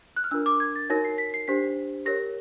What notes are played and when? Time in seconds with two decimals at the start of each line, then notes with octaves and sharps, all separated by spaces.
0.16 F#6
0.24 F6
0.31 D4 F4 A#4 E6
0.46 D6
0.60 G#6
0.76 A6
0.90 D#4 F#4 A#4 C#5 A#6
1.05 C7
1.18 B6
1.34 C7
1.48 D4 G4 C5 B6
2.06 G4 A#4 C#5 A#6